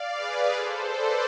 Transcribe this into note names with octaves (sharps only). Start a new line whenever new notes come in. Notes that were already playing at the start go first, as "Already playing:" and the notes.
Already playing: D5 F5
G#4 B4
A4 C5
B4 D5